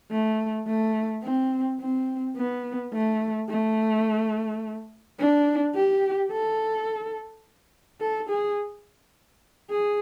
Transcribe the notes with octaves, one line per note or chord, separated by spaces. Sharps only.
A3
A3
C4
C4
B3
A3
A3
D4
G4
A4
A4
G#4
G#4